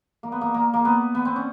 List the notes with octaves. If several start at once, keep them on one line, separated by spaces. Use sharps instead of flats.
A#3
B3
A#3
A#3
A#3
B3
B3
C4
C#4